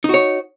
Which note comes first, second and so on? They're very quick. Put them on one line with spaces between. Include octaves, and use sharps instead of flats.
D#4 F#4 C#5